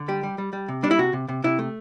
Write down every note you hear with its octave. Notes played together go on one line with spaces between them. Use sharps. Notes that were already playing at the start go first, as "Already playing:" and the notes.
Already playing: D3
G3 G4
G3
G3
G3
C3
G3 D4
E4
C3 F#4
C3
C3
C3 E4
A3